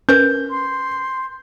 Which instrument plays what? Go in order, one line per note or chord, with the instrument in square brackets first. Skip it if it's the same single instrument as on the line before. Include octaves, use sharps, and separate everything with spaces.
[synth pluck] C#4 A#4 B4 [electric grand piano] G6
[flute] C6